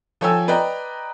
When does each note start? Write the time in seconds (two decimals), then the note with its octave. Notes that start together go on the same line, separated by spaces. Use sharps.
0.21 F3 A4 C#5 G5 G#5 E6
0.48 B4 D5 D#5 G5 A#5